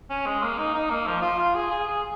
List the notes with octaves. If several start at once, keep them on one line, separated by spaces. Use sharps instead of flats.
C#4
G#3
A#3
D#4
D#4
A#3
F3
F4
F4
G#4
G#4
G#4